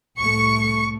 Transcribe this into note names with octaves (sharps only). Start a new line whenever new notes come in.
C2 A2 A3 C#6 C#7